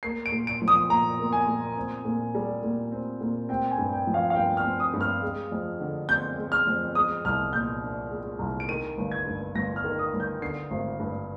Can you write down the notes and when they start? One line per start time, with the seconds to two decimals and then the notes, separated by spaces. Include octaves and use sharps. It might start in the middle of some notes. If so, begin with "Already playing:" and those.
0.03 A#3 C7
0.26 D7
0.32 A#2
0.47 D7
0.62 F3
0.68 D#6
0.89 A#2 A#5
1.19 A#3
1.33 G#5
1.47 A#2
1.77 C4
2.05 A#2
2.35 G3
2.63 A#2
2.92 C4
3.21 A#2
3.49 C4 G5
3.71 G#5
3.78 G2
3.93 G5
4.07 F3
4.14 F5
4.30 F5
4.36 G2 G5
4.57 F6
4.64 C4
4.80 D#6
4.93 G2
5.01 F6
5.22 G#3
5.52 F2
5.80 D3
6.08 C4 G6
6.38 G#3
6.52 F6
6.67 F2
6.95 G#3 D#6
7.25 C2 F6
7.53 A#2 G6
7.83 D4
8.10 G#3
8.39 C2
8.60 D7
8.69 D#3 D#7
8.97 G1
9.12 G#6
9.26 G2
9.55 G1 A#6
9.76 F6
9.84 D#3
9.99 D#6
10.13 G1
10.20 G6
10.41 D3 C7
10.71 G#1
10.99 G2